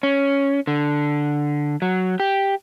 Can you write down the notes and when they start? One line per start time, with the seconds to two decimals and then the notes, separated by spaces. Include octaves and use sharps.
0.03 C#4
0.67 D3
1.82 F#3
2.20 G4